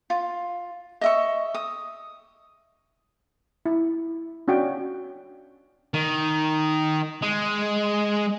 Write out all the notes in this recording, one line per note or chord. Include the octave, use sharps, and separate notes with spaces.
F4
D#5 E5 C#6
D#6
E4
C#4 D4 F#4 F5 G5
D#3
G#3